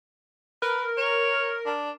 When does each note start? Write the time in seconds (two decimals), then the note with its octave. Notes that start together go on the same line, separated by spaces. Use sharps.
0.62 A#4 B4
0.97 C#5
1.66 D4